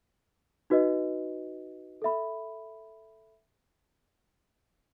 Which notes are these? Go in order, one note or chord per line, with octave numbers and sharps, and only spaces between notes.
D#4 F#4 B4 D#5
A4 E5 B5